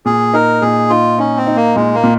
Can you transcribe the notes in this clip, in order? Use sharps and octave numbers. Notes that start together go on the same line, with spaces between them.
A#2 G#4
D#4 A#4
A#2 G#4
D#4 F4
C#4 D#4
C4
D#4
A#3
A#2 G#3
A#3
A#2